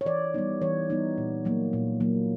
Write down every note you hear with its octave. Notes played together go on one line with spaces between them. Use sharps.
C#5
E3 D5
G3 B3 D#4
E3 C#5
G3 B3 D#4
A#2
F#3 A#3
A#2
F#3 A#3